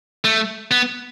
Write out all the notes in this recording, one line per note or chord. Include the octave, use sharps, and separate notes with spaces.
A3
B3